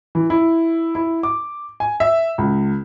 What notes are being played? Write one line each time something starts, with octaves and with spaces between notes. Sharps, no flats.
E3
E4
E4
D6
G#5
E5
C#2